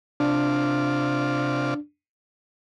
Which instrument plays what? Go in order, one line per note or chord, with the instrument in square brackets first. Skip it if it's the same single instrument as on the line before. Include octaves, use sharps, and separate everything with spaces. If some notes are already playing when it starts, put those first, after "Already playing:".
[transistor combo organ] C3 F4 D5 [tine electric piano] D4